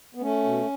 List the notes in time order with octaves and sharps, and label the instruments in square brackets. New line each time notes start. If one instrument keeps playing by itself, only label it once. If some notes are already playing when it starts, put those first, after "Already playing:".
[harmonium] B3
A3 C#4
B2